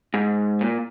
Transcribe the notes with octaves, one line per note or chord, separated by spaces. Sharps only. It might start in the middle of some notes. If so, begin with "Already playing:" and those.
G#2
A#2